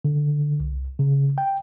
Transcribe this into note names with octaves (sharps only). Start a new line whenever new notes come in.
D3
C2
C#3
G5